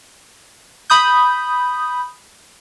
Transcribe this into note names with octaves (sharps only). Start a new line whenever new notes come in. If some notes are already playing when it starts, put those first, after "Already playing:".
B5 D#6 G6